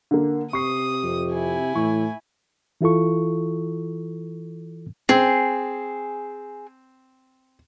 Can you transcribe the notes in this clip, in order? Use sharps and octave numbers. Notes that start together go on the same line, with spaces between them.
D3 A#3
C3 C#6 D#6 C7
F2
E4 G#5
A2 E3 C#6
E3 E4 F4 A4 C#6
C4 G#4